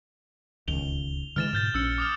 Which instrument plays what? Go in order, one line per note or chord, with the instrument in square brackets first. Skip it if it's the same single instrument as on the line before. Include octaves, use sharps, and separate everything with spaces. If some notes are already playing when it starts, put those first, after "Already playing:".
[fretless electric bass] D1 C#2 D#3 [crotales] F7 G7
[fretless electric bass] D3 E3 G#3 [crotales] F6 A6 E7
[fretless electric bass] G#2 B2 [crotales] F6 G6 A6
[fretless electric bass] A#1 C#4 [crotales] E6 C#7
[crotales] D6 D#6 F6